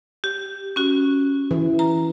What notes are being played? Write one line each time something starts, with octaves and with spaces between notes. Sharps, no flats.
G4
C#4 F#4
E3
A#5